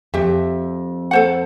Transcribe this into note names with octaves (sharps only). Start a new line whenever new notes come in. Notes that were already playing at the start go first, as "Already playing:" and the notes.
F2 G4 E5
A4 C5 F#5